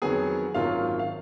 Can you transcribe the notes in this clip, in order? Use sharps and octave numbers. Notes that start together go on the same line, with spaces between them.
F2 D#3 F#3 B3 G#4 G#5
G#1 F#2 D#3 F#3 A#3 F4 F5
F5